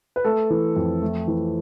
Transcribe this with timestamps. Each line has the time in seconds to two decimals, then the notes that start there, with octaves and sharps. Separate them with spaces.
0.16 B4
0.24 A3 A4
0.50 E3
0.76 F2
1.02 A3
1.28 E3